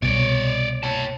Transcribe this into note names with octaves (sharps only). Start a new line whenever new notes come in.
C2 B2 C#5 D5
C#5 A5